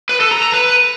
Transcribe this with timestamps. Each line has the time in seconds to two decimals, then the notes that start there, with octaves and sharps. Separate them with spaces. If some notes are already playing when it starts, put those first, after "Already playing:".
0.09 B4
0.20 A4
0.31 A#5
0.42 A#5
0.53 B4